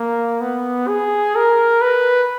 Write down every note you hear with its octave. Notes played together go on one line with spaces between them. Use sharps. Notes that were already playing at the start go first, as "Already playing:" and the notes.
Already playing: A#3
B3
G#4
A#4
B4